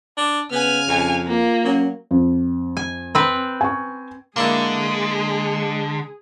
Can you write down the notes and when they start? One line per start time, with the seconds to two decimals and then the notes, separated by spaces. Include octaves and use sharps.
0.17 D4
0.52 C#3 B3 G#5 F6
0.88 F2
1.27 A#3 F4
1.65 F#3 C#4
2.11 F2
2.77 G#5
3.15 C4 B4
3.61 G#5 C#6
4.36 D3 G#3 A#3 D4 E4 G#4